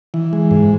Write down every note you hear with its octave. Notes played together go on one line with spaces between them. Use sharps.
E3
G#3
G#2